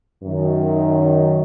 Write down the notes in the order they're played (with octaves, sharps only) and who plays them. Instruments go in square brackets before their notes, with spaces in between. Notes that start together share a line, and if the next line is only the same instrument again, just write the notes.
[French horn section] F#2 D#3